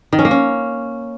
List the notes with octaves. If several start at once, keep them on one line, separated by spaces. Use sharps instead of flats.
D#3
C#4
A#3
C#4